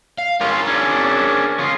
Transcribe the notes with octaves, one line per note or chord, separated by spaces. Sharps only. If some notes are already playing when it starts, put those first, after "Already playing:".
F5
C#4 F4 G#4 A#4
C#4 D4
C#3 F4